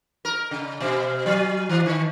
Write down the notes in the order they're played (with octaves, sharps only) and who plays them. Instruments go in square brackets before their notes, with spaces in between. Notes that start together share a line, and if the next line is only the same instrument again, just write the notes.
[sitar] A#4
C#3
B2
F#3
E3
D#3